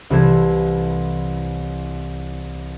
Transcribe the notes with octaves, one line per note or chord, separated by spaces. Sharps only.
C2 E3 A4 G#6